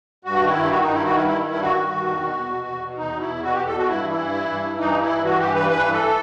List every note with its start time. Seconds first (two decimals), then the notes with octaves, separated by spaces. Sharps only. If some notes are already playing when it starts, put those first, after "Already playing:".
0.25 G2 F#4
0.40 D#3
0.48 E4
0.55 G2
0.65 G4
0.70 D#3 F#4
0.82 G2 D#4
0.93 E4
1.01 D#3 F#4
1.16 G2 E4
1.27 D#3 E4
1.46 G2 E4
1.61 D#3 F#4
1.76 G2
1.92 D#3
2.07 E2
2.21 B2
2.37 E2
2.52 B2
2.67 E2
2.82 B2
2.97 E2 D#4
3.12 B2
3.20 E4
3.28 E2
3.43 B2 F#4
3.54 E2 G4
3.66 A4
3.73 B2 F#4
3.88 G2 E4
4.03 E3
4.10 E4
4.18 G2
4.34 E3
4.49 G2
4.64 E3
4.79 G2 D#4
4.94 E3
5.02 E4
5.09 G2
5.24 E3 F#4
5.39 G2 G4
5.55 E3 B4
5.70 G2 B4
5.85 E3
5.93 A4